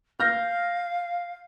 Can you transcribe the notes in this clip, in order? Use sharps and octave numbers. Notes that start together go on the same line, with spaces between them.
F5 F6 G6 A#6